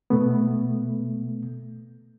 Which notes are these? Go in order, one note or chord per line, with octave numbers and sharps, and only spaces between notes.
B2 A3 B3